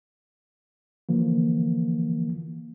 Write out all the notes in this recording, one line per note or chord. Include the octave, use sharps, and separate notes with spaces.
D3 E3 F3 A#3